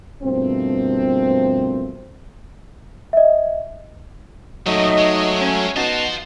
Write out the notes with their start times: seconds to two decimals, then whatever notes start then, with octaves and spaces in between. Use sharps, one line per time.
0.22 G2 B2 F3 A3 A#3 C4
3.13 D#5 E5
4.66 F#2 A#2 F#3 A3 D#4 D#5
4.98 G#3
5.40 C#4
5.76 B3 D#4 F4 F#4 C5 A5